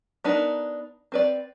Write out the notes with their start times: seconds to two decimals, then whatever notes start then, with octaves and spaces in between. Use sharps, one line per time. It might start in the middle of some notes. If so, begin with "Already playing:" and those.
0.24 B3 D4 D#4 A#4
1.12 C4 B4 D5